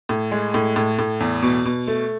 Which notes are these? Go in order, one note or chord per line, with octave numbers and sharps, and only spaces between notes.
A2
G#3
A2
A2
A2
E2
B2
B2
A3